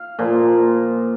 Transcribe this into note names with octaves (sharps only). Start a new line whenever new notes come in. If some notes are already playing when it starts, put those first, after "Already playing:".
Already playing: F5
A#2 F3